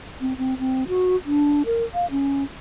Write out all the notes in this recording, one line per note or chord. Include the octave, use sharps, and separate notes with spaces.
C4
C4
C4
F#4
D4
A#4
F5
C#4